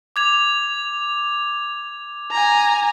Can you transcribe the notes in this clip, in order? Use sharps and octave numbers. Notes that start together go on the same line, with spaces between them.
D6 G#6 F7
G#5 A#5